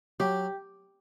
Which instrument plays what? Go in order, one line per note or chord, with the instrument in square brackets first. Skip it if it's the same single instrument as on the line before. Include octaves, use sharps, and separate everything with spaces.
[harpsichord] F#3 [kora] G4